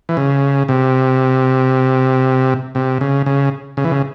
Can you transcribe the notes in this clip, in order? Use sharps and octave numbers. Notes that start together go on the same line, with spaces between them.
E3
C#3
C3
C3
C#3
C#3
C#3
E3
C#3